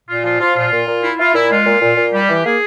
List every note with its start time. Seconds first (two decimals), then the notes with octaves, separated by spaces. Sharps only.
0.08 A#2 F4
0.24 F3 F4
0.39 F3 F4
0.55 A#2 F4
0.71 A#2
0.87 A#2
1.03 E4
1.18 E4 F4
1.34 A#2 E4
1.50 G#3 F4
1.66 A#2
1.81 A#2
1.97 A#2
2.13 G3 G4
2.29 E3
2.44 A#3 G#4